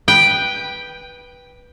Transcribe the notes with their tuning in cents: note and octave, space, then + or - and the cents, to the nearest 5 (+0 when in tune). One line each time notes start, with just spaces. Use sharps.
B4 -10 G5 +0